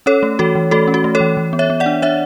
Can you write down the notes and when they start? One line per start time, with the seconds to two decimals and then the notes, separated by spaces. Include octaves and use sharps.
0.06 C#4 A4 C#5
0.23 A3
0.39 E3 F#4 A4
0.55 E3
0.71 A3 F#4 A4
0.88 C#4
0.94 F#4
1.04 A3
1.15 A4 C#5
1.20 E3
1.37 E3
1.53 B3
1.59 C#5 E5
1.70 B3
1.80 D5 F#5
1.86 D4
2.02 D4 C#5 E5